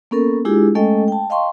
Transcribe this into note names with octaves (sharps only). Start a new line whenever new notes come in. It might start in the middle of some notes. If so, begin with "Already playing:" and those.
A#3 B3 C#4 A4 A#4
G#3 D4 E4 F4 G4 G#4
G#3 A3 C#4 A4 D#5 G5
G5 A5
D#5 F5 G5 A5 C6 C#6